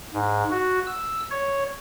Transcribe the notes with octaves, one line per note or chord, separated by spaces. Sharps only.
G#2
F#4
E6
C#5